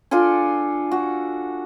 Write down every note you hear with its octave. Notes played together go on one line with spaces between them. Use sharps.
D4 F4 A4 G#5
F#4